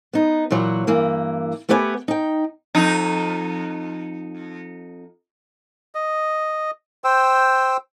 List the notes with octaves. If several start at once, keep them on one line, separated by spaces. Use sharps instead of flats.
B3 D#4
A#2 E3 F#3 F#4
G2 E3 A#3
A3 B3 G4 B4 F5 G#5
D#4 G5
F2 D#4
D#5
C5 G5 E6